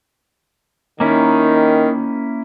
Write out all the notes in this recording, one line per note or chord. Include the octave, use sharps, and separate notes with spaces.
D#3 A#3 C#4 E4